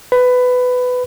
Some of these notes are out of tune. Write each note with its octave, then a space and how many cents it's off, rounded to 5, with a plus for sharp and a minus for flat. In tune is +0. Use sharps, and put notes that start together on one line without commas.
B4 +15